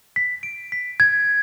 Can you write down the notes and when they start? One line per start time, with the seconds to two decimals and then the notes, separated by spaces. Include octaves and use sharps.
0.16 B6
0.43 D7
0.72 B6
1.00 G#6